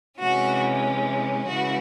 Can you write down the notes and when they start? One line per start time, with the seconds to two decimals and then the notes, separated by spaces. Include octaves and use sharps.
0.19 C3 E3 G#3 C#4 F#4
1.45 C#3 E3 G#3 F#4